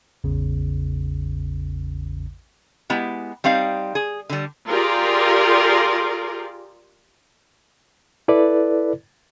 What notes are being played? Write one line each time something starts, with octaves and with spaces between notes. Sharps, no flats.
A1 E2 C#3
G#3 B3 E4 G4
G3 C4 D#4 F5
G#4
D3 G3
F4 G4 G#4 A#4 D5
E4 A4 B4 D5